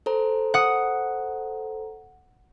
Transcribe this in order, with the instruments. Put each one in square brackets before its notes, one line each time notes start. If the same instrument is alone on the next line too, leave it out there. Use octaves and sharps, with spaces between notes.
[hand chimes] A4 C5 A#5
[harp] F#5 D#6